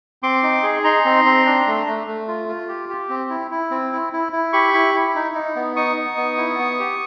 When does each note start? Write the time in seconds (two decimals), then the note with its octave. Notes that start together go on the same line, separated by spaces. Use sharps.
0.23 C4 C6 D6
0.43 D#4
0.63 G#4
0.84 D#4 A#5 C6
1.05 C4
1.25 C4
1.46 D4
1.67 A3
1.87 A3
2.07 A3
2.28 F4
2.49 F4
2.68 G4
2.89 G4
3.09 C4
3.30 E4
3.51 E4
3.71 C4
3.92 E4
4.13 E4
4.32 E4
4.53 G4 B5 C#6
4.74 E4
4.95 E4
5.15 D#4
5.35 D#4
5.56 B3
5.76 D#4 C#6 D#6
5.97 D#4
6.17 B3
6.38 E4
6.59 B3
6.79 G4